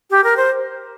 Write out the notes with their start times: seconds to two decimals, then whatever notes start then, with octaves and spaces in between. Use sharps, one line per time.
0.10 G4
0.24 A#4
0.37 C5